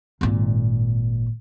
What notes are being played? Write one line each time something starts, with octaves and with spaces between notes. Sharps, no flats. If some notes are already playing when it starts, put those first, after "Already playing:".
G#1 A#2